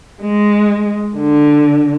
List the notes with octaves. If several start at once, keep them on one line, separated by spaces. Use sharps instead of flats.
G#3
D3